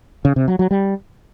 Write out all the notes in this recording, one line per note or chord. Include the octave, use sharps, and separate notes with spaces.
C#3
C3
F#3
F#3
G3